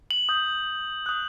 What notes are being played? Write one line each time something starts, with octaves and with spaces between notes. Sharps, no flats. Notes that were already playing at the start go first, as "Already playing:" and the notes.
F#7
D#6 G6
D#6 F#6